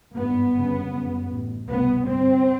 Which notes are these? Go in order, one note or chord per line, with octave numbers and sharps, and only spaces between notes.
G#1 G2 B3
G1 F#2 C#3
G1 F#2 C#3
A1 A2
C2 B2 B3
G1 G2 C4